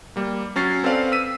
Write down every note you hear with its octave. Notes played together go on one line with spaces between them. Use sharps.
G3 A#3
F#3 C#4 A6 C7
C4 A4 B4 D5 F5
E6 B6 D#7